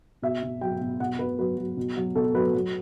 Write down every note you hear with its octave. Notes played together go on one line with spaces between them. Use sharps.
B2 E5
B2
F#3 G5
B2
B2 F#5
B2 B4
F#3 B4
F#3
B2
F#3
B2 A4
F#3 B4
F#3